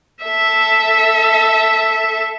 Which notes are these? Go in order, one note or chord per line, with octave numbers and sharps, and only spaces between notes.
A4 E5